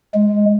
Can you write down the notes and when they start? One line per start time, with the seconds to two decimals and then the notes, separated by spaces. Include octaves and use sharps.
0.14 G#3